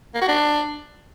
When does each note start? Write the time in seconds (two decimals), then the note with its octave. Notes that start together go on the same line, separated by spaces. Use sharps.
0.15 A#3
0.21 F#4
0.28 D4